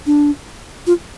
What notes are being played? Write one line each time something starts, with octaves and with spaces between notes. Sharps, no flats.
D4
F4